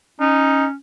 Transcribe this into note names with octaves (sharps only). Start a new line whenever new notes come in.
C#4 D#4